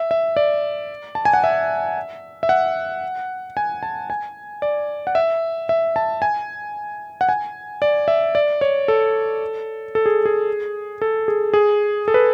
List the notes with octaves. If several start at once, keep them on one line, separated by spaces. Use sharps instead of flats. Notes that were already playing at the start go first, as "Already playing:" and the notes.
Already playing: E5
E5
D5
A5
G#5
F#5
E5
E5
F#5
G#5
A5
G#5
D5
F#5
E5
E5
A5
G#5
F#5
G#5
D5
E5
D5
C#5
A4
A4
G#4
G#4
A4
G#4
G#4
A4
B4